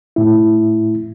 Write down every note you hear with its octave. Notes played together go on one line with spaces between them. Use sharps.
A2 E4